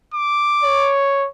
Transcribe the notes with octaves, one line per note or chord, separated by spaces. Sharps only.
D6
C#5